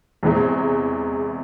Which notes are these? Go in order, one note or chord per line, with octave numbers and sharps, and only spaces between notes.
E2 C3 E3 G#3